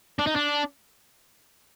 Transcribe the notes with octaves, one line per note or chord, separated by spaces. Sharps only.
D4
D#4
D4